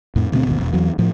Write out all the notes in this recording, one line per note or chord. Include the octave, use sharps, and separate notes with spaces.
F2 A2
D2 B2 A#3 C4
G#1 D#2 B2
E1 E2
E2 E3 F#3
A2 F3